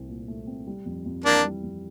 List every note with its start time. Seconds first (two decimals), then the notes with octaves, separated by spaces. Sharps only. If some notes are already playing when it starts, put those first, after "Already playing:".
Already playing: C2 A3 C4
0.09 A#2
0.28 A3
0.47 C4
0.67 G3
0.86 F2
1.06 F2
1.25 E3 A#3 D4
1.44 G3
1.63 F2